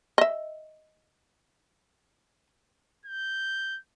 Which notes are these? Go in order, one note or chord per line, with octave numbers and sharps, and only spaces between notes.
D#5 E5
G6